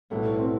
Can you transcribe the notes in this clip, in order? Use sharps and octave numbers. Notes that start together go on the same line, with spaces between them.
B1 A2 G3 A3 B3 E4
C4